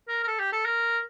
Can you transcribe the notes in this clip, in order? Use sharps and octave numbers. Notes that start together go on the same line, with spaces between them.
A#4
A#4
A4
G4
A4
A#4